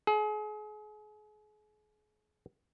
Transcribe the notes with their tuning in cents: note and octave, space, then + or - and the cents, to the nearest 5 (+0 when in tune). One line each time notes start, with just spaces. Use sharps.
G#4 +35